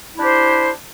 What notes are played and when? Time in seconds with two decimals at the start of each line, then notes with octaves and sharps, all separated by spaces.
0.16 E4
0.19 D4
0.21 G4
0.24 C5